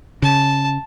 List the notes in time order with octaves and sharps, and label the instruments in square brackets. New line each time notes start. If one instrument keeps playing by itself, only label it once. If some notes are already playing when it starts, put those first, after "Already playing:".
[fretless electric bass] C#3 [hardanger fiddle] A5